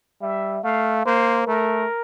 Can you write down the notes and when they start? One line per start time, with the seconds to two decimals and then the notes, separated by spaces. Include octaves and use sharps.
0.21 G3 E5
0.63 A3 F5
1.05 A#3 C5
1.46 A3 A#4